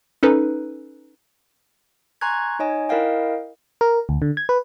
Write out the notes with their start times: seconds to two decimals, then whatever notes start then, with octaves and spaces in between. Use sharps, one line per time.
0.23 C#4 D#4 A4 B4
2.21 G#5 A#5 C6 C#6 F#6 G#6
2.59 D#4 C#5 D#5 G#5
2.89 E4 A#4 D#5 F5 G5
3.81 A#4
4.09 D2
4.22 D3
4.37 G#6
4.49 B4